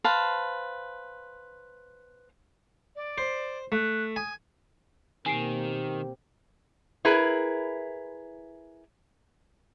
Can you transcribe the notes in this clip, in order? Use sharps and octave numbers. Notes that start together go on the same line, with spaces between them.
B4 C5 F5 A5
D5
C5
A3 F#6
G#5 D#6
B2 D#3 A#3 C4 G4 G#5 C7 D7
E4 G#4 A#4 B4